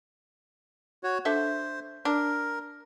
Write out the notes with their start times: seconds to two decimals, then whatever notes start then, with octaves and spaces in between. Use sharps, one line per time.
1.03 F#4 C#5
1.25 D3 A4 C5 E5
2.05 D4 A#4